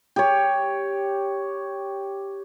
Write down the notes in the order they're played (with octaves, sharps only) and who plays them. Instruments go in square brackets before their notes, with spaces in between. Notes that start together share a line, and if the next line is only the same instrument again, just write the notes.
[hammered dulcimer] G4 C#5